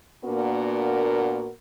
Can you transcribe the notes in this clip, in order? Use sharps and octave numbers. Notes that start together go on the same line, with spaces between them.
A#2 A#3 B3 D4 F#4 A#4